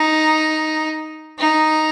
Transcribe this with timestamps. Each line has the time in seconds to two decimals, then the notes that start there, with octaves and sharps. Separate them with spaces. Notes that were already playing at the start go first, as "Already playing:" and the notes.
Already playing: D#4
1.39 D#4